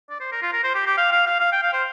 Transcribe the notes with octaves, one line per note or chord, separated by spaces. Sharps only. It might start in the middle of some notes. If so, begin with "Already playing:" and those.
D5
C5
A#4
F4
A#4
C5
G4
G4
F5
F5
F5
F5
G5
F5
C5